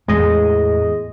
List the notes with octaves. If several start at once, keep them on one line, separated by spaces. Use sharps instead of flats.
E2 A2 G#3 D#5